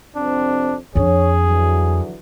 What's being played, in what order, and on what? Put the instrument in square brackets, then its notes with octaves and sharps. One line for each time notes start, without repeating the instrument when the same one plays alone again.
[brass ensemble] C2 F2 C4 [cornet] D4
[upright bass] F2 D4 [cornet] G#4 [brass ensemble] C#5
[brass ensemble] D3 E3 F#3